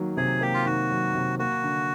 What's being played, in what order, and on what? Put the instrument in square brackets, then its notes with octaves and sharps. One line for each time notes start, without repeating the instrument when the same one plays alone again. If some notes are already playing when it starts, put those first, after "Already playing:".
Already playing: [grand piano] D#3 F#3 A#3
[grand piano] C3 [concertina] G#4
[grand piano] A#3 [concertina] G4
[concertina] F4
[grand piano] D#3 [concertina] F#4
[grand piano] F#3
C3
[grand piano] A#3 [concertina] F#4
[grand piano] D3